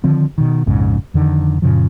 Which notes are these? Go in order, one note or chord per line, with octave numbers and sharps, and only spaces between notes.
D3 D#3 F3 C4
B2 D#3
A#1 F2 G#2 C#3
F2 D3 D#3
F#2 A#2 C#3 F3